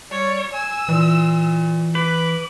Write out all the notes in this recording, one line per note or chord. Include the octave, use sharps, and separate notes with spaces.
G3 C#5 D5
G#5 E6
A#2 E3
B4 D6